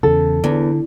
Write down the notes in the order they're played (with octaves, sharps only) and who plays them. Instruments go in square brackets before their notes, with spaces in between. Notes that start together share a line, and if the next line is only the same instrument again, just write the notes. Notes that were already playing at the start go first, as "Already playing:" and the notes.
[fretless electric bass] E2 C#3 [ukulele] A4
[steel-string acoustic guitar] E2 [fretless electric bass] D3